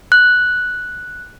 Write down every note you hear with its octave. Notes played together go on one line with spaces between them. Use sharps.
F#6